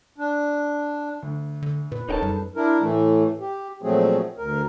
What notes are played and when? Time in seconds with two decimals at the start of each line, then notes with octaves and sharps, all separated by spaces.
0.18 D4
1.22 D2
1.62 D3
1.92 A#2 B4
2.09 D#1 C#4 D#4 A4 A#4 G5 A5
2.23 F#2 G3 A4
2.56 D4 E4 A#4
2.81 A2 E3 A3
3.40 G4
3.82 A#2 F3 F#3 A3 C4 G#4
4.37 D2 A#4